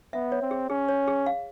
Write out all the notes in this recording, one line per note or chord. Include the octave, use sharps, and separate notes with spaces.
B3 E5
C#5
C4
G#4
C#4 G#4
C#5
G#4
F5